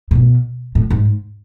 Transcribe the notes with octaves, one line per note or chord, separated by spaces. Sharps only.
A2
B2
A2
G#2